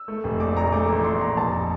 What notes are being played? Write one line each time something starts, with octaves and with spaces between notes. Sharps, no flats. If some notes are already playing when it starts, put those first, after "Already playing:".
Already playing: E6
A3
F1
A#1 D6
A#1 A#5
A3 D6
A1
A#1 C6
A#1 A#5
F1 A5